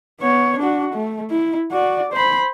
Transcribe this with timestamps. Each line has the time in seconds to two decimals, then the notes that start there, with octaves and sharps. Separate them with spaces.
0.21 B3 C#5
0.59 D4 F#4
0.94 A3
1.31 E4
1.72 F#4 D5
2.13 C5 B5